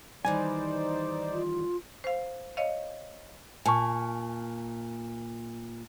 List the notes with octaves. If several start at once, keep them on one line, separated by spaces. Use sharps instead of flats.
D#3 E3 G3 D#4 C5 D5 G#5
F4
C5 F5
C#5 D#5 F5
A#2 G#5 A5 C#6